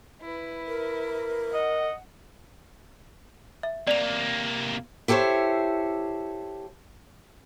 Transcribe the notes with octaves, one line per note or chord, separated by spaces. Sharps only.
E4 B4
A#4
D#5 F#5
E5
C3 A#3 D5 F7
E4 G4 A4 C5 C#5